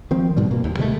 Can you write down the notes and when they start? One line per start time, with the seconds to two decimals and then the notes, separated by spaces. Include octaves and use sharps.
0.11 D#3 F3 C4
0.36 G#2 B2 G3
0.51 B2 A#3
0.64 D#2
0.79 C3 D#3 G#3 A3